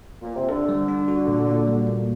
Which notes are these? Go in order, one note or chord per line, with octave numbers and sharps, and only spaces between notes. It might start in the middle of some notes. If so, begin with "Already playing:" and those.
A#2
C3
D3 A4
G3
D4
F#4
A#2
A#2
G3
A#3